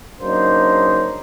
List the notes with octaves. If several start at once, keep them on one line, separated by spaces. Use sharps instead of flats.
C#3 F#3 A#3 D4 D#4 C5